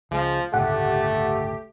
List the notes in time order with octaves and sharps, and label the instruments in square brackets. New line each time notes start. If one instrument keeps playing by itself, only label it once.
[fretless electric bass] C#2 G#3 [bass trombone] F3
[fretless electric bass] G1 C#2 A2 [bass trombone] A3 [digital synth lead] G4 [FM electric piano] F#5